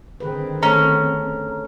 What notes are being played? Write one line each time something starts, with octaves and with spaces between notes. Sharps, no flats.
D3 D#3 C4 G#4 B4
A3 C#4 A4 A#5